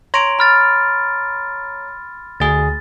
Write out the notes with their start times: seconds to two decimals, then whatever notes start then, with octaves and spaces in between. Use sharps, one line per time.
0.14 C#5 A#5 C6 D7
0.39 B5 F6 A6
2.40 D2 G#4 A6